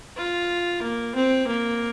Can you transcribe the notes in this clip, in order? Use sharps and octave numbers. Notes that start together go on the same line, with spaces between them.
F4
A#3
C4
A#3